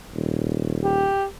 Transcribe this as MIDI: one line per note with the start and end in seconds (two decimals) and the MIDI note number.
0.14 1.12 27
0.84 1.25 67